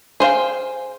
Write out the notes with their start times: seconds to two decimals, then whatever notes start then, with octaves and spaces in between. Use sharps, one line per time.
0.20 G#4 C5 F5 G5